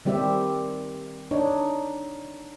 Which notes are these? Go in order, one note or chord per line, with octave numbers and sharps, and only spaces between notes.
D#3 G3 C4 G4 E5
D4 D#4 C#5